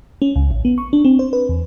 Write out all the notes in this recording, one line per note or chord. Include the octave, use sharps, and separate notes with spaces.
C#4
C#2
A1
B3
C#6
D4
C4
C5
B4
E2